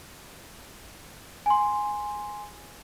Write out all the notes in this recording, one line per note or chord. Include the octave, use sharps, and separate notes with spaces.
G#5 C6